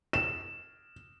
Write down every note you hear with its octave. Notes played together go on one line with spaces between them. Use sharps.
E7